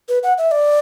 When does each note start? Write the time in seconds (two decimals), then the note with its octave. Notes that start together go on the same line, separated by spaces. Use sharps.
0.09 B4
0.23 F#5
0.38 E5
0.51 D5